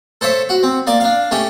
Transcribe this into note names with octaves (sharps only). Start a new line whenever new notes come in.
A4 C5 C#5 E5
F#4
C4
A#3 D5 D6
D4 F5
A3 C#4 G4